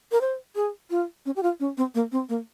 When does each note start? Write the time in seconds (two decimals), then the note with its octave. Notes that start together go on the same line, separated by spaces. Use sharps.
0.12 A#4
0.21 C5
0.56 G#4
0.90 F4
1.26 C#4
1.36 G4
1.43 F4
1.60 C#4
1.77 C4
1.95 A#3
2.12 C4
2.29 A#3